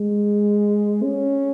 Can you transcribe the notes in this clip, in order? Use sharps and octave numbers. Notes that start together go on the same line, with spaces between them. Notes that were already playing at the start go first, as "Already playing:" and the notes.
Already playing: G#3
C#4